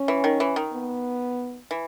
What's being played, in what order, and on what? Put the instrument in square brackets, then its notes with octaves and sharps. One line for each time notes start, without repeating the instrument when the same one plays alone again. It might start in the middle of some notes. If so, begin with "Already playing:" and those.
Already playing: [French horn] C#4
[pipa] E3
D#3
E3
D#3
[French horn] B3
[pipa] E3